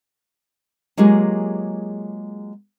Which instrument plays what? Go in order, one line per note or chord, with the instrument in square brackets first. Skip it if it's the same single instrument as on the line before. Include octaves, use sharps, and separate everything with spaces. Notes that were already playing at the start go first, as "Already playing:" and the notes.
[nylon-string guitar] F#3 G#3 A#3 F4 G4 G#4